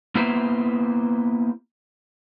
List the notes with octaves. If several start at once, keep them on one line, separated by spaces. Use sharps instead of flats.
A#3 B3 E4 G4 B4 C5